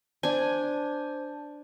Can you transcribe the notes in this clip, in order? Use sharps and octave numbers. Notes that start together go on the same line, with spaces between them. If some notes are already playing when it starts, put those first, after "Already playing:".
D4 C5 G#5 A5